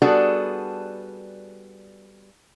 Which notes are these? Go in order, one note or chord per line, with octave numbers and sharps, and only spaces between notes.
G3 B3 D4 F#4 G#4 A4